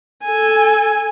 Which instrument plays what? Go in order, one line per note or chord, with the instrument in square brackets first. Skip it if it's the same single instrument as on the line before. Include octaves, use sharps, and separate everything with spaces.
[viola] A4 G#5